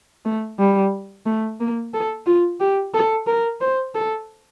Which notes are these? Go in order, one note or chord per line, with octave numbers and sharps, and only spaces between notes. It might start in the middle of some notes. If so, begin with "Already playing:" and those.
A3
G3
A3
A#3
A4
F4
G4
A4
A#4
C5
A4